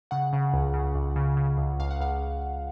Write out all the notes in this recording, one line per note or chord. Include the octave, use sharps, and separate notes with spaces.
C#3 F#5
C#3
C#2
C#3
C#2
C#3
C#3
C#2
C#2 F5
F#5
C#2 F5